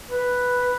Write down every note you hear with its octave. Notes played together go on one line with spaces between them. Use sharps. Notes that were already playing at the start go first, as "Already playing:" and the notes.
B4